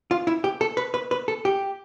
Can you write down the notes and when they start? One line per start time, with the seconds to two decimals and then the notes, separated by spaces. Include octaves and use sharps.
0.11 F4
0.27 E4
0.44 G4
0.61 A4
0.77 B4
0.94 B4
1.11 B4
1.28 A4
1.45 G4